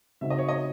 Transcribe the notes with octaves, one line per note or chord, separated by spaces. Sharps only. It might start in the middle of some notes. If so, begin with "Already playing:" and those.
C#3 G#3 C4 D#4 F#4 E5
D#5
C#5
D#5